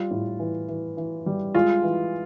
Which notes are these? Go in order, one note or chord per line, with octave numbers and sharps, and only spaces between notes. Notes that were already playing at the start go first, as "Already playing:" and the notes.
Already playing: G3 F4
A2
E3
E3
E3
G3
G#3 F4
E3